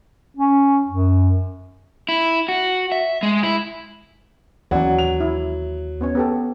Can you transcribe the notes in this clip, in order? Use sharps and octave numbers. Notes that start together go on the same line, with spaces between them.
C#4
F#2
E4
F#4
E5
G#3
E4
D#2 E3 F#3 C#4 D5 F#5
F7
E4
B3 C#4 C#5
B3 G4 A4